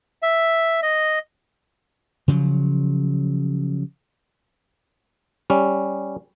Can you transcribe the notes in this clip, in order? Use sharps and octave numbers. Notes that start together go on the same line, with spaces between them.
E5
D#5
C#3 F3 F#3
G3 C#4